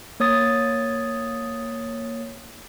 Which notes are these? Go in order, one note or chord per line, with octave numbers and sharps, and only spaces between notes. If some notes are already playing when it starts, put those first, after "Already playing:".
A#3 C#5 D#6 A6